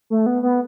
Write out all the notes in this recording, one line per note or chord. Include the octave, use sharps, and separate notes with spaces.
A3
B3
B3